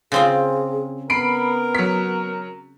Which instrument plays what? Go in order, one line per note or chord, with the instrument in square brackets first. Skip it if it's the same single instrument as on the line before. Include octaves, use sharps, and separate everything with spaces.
[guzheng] C#3 C4 F4 [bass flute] G#4
[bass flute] B3 [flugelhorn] A#4 [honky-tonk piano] B5 C7 D7
[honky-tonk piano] F#3 B6